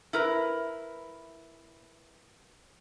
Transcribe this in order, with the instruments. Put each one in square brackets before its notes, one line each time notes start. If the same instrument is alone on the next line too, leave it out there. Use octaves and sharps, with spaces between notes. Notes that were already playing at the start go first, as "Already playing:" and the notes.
[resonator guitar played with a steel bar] E4 A#4 B4